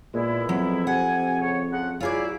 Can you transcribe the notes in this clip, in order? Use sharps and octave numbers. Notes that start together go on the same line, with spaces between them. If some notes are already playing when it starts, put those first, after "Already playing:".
A#2 G#3 B3 E4
F2 F#3
C3 F#5 G#5
C#3 C#5
C#3 F3 F#5
F#3 E4 F4 G#4 D5